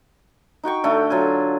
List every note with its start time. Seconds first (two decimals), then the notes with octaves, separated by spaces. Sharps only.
0.63 D#4 F#4 G5 C#6
0.84 D3 A3
1.10 F#3 F4 G#5